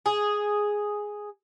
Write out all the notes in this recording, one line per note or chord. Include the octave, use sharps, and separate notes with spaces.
G#4